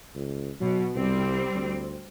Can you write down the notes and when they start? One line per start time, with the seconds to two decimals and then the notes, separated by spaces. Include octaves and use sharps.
0.15 C#2
0.60 B2 F#3
0.95 C2 G3 C4
1.55 D2